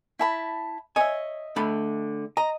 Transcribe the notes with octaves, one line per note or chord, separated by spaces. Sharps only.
E4 A5 B5
C#5 D#5 E5 G#5
D3 A3 B5
D#5 A#5